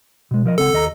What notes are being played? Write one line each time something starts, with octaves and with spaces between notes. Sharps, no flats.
B2 G#3
F3 A#4 D#5
C#2 C4 A4 F#5
D#2 D#5 A#5